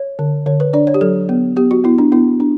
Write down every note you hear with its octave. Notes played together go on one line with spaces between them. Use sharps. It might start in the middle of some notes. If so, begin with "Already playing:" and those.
Already playing: C#5
D3
D3 C#5
B4
D4 D5
C#5
G4
F#3 A4
B3
B3 G4
F#4
B3 E4
D4
B3 E4
D4